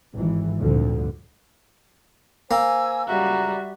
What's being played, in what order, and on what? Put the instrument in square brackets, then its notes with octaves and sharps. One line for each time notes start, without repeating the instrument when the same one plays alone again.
[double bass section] G#1 E3
G#1 D2 G2 A#2 D3 F3
[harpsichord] A#3 [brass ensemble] C5 G#5 [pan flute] E6
[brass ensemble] C#2 F#2 A#5 [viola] G3 F#4 [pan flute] E5